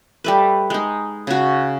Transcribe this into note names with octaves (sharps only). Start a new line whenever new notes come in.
G3 A3 B4
G#3 D#4
C#3 F#4